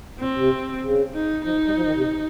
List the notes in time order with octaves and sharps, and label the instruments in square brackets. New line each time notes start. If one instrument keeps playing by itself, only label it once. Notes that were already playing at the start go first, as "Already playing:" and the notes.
[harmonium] A#2 [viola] C4
[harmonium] C3
C#3
[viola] D#4
[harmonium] F3 [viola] D#4
[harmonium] G3
F3
D#3
C3